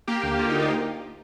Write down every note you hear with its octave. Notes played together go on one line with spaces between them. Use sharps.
A#3 G4
D2
A#3 F4
D2 D#4
F4